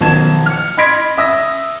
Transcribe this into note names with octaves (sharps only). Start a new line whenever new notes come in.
B1 D#3 F3 A5 G#6 E7
F6 C#7
D#5 B5 C6 G#6 B6 D7
E5 D#6 E6 A#6